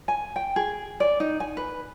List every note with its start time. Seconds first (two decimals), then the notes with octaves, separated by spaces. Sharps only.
0.08 G#5
0.36 G5
0.56 G#4
1.00 D5
1.20 D#4
1.40 G#5
1.57 B4